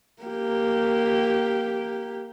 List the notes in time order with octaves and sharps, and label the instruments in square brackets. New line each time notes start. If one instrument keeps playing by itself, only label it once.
[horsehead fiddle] A#3 G4